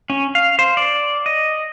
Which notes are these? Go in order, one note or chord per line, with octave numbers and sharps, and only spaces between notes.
C#4
F5
C5
D5
D#5